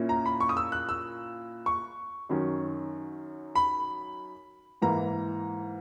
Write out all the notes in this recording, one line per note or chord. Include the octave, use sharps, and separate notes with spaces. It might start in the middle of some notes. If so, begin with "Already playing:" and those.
Already playing: A#2 A#3 C#4 E4
A#5
B5
C#6
D#6
E6
F#6
E6
C#6
F#2 D#3 F#3 C#4
B5
G#2 E3 A#3 A#5